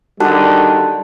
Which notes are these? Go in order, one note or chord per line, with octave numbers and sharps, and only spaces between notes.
D3 D#3 G3 F#4 A5 F#6